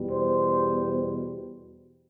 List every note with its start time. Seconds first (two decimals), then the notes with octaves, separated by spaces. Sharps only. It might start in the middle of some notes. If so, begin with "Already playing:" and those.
Already playing: E2 B2 G3
0.09 C5